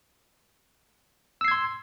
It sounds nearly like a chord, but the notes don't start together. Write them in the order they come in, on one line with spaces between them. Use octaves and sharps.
E6 C7 G#6 C6